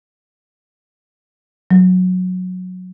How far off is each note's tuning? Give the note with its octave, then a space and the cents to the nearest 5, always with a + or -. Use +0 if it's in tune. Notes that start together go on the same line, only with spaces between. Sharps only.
F#3 -15